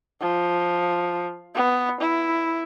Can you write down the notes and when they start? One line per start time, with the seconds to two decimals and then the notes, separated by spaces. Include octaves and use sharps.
0.21 F3
1.55 B3
2.01 E4